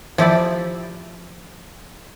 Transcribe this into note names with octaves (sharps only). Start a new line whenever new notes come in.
F3 E4 G4 D5